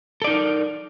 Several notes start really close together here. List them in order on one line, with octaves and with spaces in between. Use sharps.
A4 D5 D#4 A#4